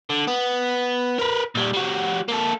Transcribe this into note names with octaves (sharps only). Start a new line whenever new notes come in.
D3
B3
A#4 B4
A#2 G3
G3 F#4
A#3 A4